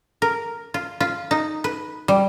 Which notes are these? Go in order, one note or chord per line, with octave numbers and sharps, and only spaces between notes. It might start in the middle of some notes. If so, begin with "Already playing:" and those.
A#4
F4
F4
D#4
B4
G3